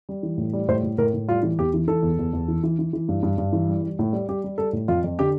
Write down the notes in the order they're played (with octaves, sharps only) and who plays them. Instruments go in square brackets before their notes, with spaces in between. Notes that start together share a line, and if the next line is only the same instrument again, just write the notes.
[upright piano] G3
E3
A2
G3
A2 C5
A2
A2 A#4
A2
G3 F4
E3
E2 G4
E3
E3 A4
E2
E2
E2
E3
E3
E3
E3
G2
G2
G2
E3
G3
G3
A2
G3
G3 G4
G3
G3 A4
A2
F2 F4
F2
D3 G4